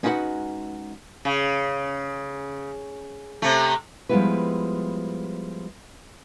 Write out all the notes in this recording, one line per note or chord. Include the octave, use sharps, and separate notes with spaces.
G#3 C#4 D#4 F#4 B4 F#5
C#3
C3 A3
F3 G3 G#3 B3 E4 B4